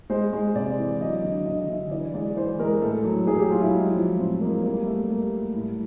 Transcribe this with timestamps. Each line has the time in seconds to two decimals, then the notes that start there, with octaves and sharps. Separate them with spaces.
0.10 G#3 C5
0.33 G#3
0.55 C3 D5
0.78 E3
1.01 F#3 D#5
1.23 D3
1.46 D3 D#5
1.69 D3 E5
1.91 E3 D5
2.14 G#3 D5
2.37 E3 C5
2.59 G#3 A#4
2.82 A2 A4
3.04 F#3
3.27 F#3 G#4
3.39 G4
3.50 F#3 F4
3.61 E4
3.73 G#3
3.95 F3
4.18 A2 C4
4.40 G#3 A#3
4.63 G3 A#3
4.86 G3 A3
5.09 G3 A#3
5.31 G3
5.54 A2